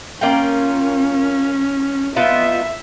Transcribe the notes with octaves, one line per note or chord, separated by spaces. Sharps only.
A#3 C#4 F4 G5
B3 D#4 F4 E5